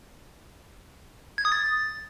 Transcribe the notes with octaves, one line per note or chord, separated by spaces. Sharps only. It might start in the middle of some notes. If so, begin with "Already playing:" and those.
G#6
D#6
A6